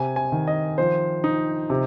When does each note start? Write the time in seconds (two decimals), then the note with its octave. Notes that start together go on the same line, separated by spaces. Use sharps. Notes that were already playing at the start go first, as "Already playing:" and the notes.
Already playing: C3 G#5
0.16 G#5
0.32 D#3
0.47 D#5
0.78 F3 C5
1.24 D#4
1.70 C3